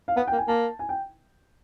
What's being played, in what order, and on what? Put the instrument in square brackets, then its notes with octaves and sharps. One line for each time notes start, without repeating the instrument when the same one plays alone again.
[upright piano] F5
[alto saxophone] B3 [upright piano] F#5
[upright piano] G5
[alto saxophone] A#3
[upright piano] G#5
[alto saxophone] A#3 [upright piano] A5
[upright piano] G#5
G5